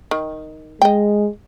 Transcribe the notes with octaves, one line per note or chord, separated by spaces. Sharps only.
D#3
G#3 D#5 G5